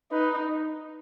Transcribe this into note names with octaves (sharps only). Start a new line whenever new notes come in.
D#4 B4